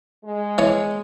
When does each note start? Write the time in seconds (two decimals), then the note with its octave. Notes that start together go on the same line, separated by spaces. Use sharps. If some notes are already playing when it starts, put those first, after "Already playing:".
0.24 G#3
0.58 E3 C#5